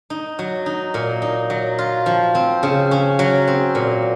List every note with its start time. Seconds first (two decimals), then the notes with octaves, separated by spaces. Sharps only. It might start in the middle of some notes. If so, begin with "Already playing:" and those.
0.10 D#4
0.39 F#3
0.66 D#4
0.94 A#2
1.22 D#4
1.50 F#3
1.78 F4
2.06 F3
2.35 C4
2.63 C#3
2.91 C#4
3.19 F#3
3.47 C4
3.75 A#2